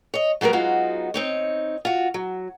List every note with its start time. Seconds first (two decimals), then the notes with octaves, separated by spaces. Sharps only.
0.14 C#5 D#5
0.41 F#3 G3 A#3 B3 A#4
0.53 F#3 G#3 B3 D#4 F4 F#4
1.14 C4 D#4 C#5
1.85 F4 F#4
2.14 F#3